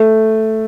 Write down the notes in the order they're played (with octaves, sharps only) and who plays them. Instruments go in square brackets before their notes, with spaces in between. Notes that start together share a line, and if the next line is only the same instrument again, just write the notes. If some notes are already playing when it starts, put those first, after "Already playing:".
Already playing: [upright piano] A3